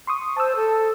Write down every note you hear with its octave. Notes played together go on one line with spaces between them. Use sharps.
C6 C#6 D#6
C5 A5 D#6 E6
A4